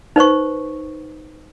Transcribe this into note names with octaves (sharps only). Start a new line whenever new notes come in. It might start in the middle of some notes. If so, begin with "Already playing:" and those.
D#4 B4 C5 C#6